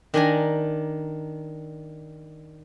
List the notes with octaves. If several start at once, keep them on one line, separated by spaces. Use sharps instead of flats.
D#3 D4 G#5 A#5